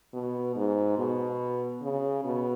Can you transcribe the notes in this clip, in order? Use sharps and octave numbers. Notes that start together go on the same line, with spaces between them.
B2
G#2
B2
C#3
B2